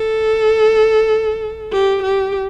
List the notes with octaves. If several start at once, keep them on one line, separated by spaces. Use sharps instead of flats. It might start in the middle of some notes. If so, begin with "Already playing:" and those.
Already playing: A4
G4
G4